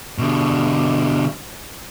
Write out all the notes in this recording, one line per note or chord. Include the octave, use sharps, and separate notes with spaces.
B2 D3